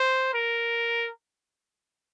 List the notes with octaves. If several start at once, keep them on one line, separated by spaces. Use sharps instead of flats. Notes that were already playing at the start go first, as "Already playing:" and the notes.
Already playing: C5
A#4